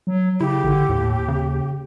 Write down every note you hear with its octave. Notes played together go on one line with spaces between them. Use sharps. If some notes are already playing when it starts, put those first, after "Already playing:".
F#3
C#3 E4 G4
A1 D3
D#2 A2
C#3